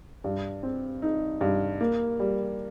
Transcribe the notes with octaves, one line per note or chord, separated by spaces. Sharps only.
G2
C4
D#4
G2
A#3
G3